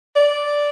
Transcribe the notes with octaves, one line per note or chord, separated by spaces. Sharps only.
D5